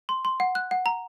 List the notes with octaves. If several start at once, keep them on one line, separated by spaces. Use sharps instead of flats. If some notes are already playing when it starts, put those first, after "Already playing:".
C6
C6
F#5
F#6
F#5
A#5